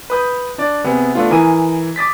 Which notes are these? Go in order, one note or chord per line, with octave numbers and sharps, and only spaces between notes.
B4 D#6 G6
D4 D5
C3 B3 G#4
A3 B3 D4 F4
E3 A#4 G#5 D#6 D#7
D6 D#6 A6 B6